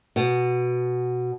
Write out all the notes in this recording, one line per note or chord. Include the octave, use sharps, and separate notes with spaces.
B2